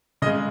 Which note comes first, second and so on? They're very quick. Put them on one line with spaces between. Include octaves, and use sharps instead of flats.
C#3 D#5 G#3